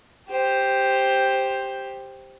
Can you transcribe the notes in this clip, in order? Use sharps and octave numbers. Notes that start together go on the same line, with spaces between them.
G4 C5